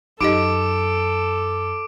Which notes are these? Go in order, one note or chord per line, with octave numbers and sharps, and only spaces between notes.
F#2 D#4 G4 A4 D#5 D6 D7